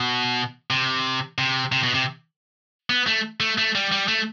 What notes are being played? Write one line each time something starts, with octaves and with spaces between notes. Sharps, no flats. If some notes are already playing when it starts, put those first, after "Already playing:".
Already playing: B2
C3
C3
C3
B2
C3
B3
A3
A3
A3
G3
G3
A3